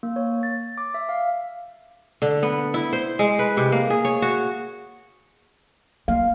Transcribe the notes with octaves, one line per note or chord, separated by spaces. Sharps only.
A#3
C#5
A6
D6
E5
F5
D3
B3
E4
C5
G#3
B4
C3
A#3
G#4
C#5
F#4
A#3 F5